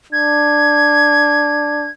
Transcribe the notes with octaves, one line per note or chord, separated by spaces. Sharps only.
D4 G#6